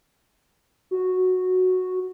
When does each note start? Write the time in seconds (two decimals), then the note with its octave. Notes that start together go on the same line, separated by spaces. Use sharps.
0.91 F#4